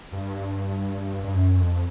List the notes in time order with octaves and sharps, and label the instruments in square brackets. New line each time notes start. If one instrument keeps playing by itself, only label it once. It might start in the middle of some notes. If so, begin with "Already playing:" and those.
[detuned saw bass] G2
G2
F#2
F2